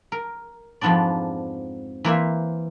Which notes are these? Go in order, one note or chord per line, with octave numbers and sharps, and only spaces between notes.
A#4
F2 G#2 F3 B3 D4 D5
E3 A#3 C5 E5